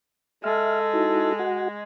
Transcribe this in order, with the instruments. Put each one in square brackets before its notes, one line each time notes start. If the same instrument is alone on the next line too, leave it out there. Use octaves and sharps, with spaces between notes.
[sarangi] G#3 [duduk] A4 [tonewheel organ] E5 F6
[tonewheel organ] D#4 E4 F#4
F#4 F#5